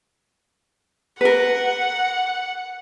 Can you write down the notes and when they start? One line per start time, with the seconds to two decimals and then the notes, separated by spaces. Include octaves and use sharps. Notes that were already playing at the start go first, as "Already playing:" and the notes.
1.21 A#4 B4 F#5